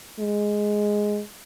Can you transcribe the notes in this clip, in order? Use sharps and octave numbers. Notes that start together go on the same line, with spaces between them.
G#3